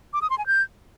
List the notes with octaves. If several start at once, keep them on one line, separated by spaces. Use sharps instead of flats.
D6
D#6
C6
G#5
G6